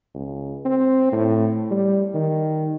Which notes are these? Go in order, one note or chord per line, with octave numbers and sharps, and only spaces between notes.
C#2
C4
A2
G3
D#3